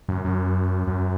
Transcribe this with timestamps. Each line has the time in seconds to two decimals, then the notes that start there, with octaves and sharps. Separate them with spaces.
0.09 F#2
0.25 F#2
0.87 F#2